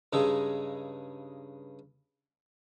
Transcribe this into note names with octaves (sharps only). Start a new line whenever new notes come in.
G2 C#3 G#3 D#4 A4